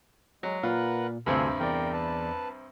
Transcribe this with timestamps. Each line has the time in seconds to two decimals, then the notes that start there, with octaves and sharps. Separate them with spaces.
0.43 F#3 G#3
0.63 A#2 F4 A#4 B4 F#5
1.26 D2 G2 C3 C4 F4 A4 G#5
1.60 E2 A#4 D5 G5
1.93 B4 A5